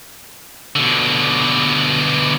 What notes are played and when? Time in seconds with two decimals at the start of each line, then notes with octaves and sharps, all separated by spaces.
0.76 B2 D3